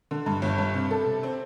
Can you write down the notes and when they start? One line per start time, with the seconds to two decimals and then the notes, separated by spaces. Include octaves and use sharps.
0.11 D3
0.26 G2
0.42 G1
0.58 G2
0.74 C3
0.91 A4
1.06 C3
1.23 C4